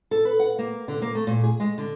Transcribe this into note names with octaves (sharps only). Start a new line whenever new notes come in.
A4
B4
F#5
A#3
D3
A#3
A3
A#2
G#4
G#3
D3